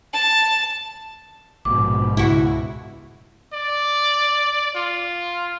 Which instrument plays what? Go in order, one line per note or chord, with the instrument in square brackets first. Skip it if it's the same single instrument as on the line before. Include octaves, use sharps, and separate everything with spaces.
[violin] A5
[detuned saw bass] A#1 [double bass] G#2 B2 [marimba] D6
[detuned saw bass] C#2 [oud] E4 F#4
[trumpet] D5
F4